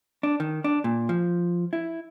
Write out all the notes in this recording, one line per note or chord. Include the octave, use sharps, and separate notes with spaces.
D4
D#3
D4
A#2
F3
E4